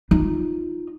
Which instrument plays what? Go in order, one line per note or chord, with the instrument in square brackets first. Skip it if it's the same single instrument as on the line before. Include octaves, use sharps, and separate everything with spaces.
[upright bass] D#4 F4